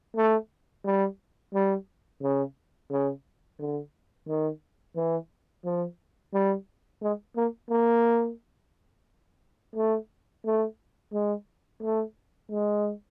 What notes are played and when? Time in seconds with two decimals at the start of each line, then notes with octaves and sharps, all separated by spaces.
0.16 A3
0.85 G3
1.54 G3
2.22 C#3
2.90 C#3
3.59 D3
4.28 D#3
4.96 E3
5.64 F3
6.33 G3
7.02 G#3
7.36 A#3
7.70 A#3
9.76 A3
10.44 A3
11.13 G#3
11.82 A3
12.50 G#3